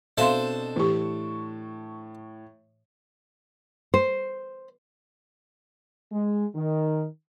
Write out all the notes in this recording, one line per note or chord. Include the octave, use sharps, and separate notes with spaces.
B2 C4 D4 A4 C5 E5 F5 C6
A2 E3 G4 C#6
C5
G#3
D#3